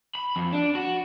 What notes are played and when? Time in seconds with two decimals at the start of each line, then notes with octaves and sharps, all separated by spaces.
0.15 B5
0.36 F2
0.53 D4
0.75 F#4